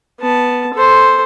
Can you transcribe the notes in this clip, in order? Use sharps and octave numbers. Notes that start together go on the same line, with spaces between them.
B3 A5
A4 C5